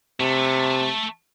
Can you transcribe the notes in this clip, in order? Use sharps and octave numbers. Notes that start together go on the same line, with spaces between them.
C3 A3